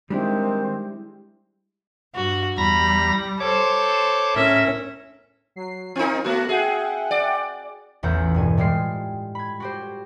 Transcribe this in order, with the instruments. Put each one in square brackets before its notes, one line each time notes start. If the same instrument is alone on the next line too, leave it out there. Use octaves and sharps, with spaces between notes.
[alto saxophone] D#3 [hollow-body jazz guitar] G3 D4 E4 [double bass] G#3 [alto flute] C4
[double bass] G2 [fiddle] F#4
[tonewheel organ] E2 A#5 A#6 [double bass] G3 [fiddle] B5
[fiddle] A4 C5 [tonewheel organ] C#5 D6
[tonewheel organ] A2 A#4 [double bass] C#4 [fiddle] E5
[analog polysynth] F#3 C7
[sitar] C4 D#4 [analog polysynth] F4 A#4
[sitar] A3 F#4 [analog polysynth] B3 F#6 A#6
[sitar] G#4 [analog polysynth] E5 F#5 G5
[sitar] D5
[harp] A1 E2 F4 F#5 G6
E1 G2 G#5
A2 G3 G#3 F4 C7
B5 G#6
F#4 G4 C5